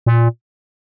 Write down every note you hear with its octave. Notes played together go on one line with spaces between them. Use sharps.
A#2